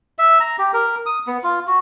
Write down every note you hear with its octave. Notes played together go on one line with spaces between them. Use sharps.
E5
A#5
G4
A#4
D#6
B3
F4
F#4